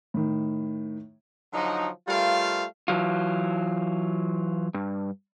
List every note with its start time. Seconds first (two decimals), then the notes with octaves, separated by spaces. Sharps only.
0.14 A2 D#3
1.53 D3 F3 F#3 D#4
2.07 G3 A3 F4 A#4 C5 F5
2.88 E3 F#3 F4
4.74 G2